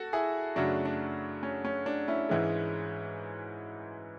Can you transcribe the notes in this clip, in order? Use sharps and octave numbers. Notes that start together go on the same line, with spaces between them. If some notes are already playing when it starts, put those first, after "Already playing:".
Already playing: F#4 A4
E4 G#4
F#2 C#3 F#3 A3 D4 F#4
D4
C#4
C#4
D4
C#4 E4
G#2 E3 G#3